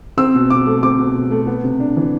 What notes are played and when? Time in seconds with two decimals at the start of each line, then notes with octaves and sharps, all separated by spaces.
0.17 C4 E6
0.35 B2
0.50 B2 D6
0.66 A3
0.83 C4 D6
0.99 B2
1.16 B2
1.31 A3
1.47 B3
1.64 C3
1.80 D4
1.96 E3